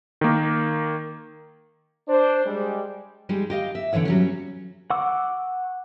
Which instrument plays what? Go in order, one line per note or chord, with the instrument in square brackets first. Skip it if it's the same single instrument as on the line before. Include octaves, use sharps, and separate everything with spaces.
[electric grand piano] D#3 A#3
[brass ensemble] D4 C5
G3 G#3
[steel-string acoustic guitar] G3 G#3 D#4 G4 G#4
G4 D#5 F5
E5
B2 D3 E3 C#5 F#5
F#3 G3 C#4
[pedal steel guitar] F#5 C#6 D6 E6